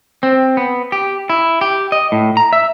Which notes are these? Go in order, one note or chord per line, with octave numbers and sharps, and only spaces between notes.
C4
B3
G4
E4
G4
D#5
A2
A#5
E5